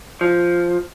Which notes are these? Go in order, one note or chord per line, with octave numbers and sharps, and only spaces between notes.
F3